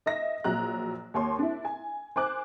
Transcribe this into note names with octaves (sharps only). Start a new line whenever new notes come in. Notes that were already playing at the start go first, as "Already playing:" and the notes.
D#5 E5 A#6
A#1 F#3 A#5 F#6
D#2 C#5 C6
D4 E4
G#5
C5 G#5 D6 F#6